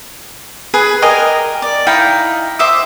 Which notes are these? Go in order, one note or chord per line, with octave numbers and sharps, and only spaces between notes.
G#4 B4 G#5
G4 A#4 D#5 G#5
D5
D#4 E4 F5 G5
C5 E5 D6 D#6